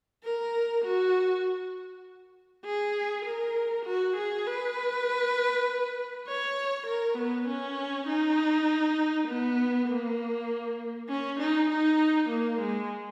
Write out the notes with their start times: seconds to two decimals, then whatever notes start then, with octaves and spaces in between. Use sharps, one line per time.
0.24 A#4
0.85 F#4
2.65 G#4
3.25 A#4
3.85 F#4
4.16 G#4
4.46 B4
6.27 C#5
6.86 A#4
7.17 B3
7.48 C#4
8.08 D#4
9.28 B3
9.88 A#3
11.09 C#4
11.40 D#4
11.69 D#4
12.29 A#3
12.60 G#3